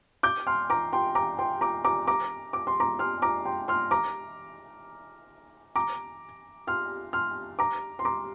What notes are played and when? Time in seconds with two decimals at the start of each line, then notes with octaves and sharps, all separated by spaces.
0.23 D6 G6
0.47 C6 F6
0.70 A#5 D6
0.93 G5 C6
1.15 A#5 D6
1.39 G5 C6
1.61 A#5 D6
1.85 A#5 D6
2.07 A#5 D6
2.53 D6
2.67 C6
2.80 A#5 D6
2.99 C6 F6
3.22 A#5 D6
3.45 G5 C6
3.68 C6 F6
3.91 A#5 D6
5.76 A#5 D6
6.67 C6 F6
7.13 C6 F6
7.59 A#5 D6
7.99 C6
8.05 A#5 D6